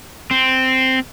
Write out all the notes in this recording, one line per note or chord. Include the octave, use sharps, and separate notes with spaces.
C4